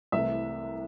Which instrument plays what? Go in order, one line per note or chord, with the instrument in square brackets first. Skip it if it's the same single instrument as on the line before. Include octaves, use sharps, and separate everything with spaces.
[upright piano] C2 C3 E3 A3 E5